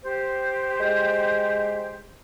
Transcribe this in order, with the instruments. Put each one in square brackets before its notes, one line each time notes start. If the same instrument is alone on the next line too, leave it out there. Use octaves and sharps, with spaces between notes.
[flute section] G4 C5
[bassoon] G#3